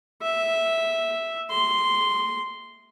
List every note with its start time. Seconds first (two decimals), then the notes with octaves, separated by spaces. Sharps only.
0.22 E5
1.51 C6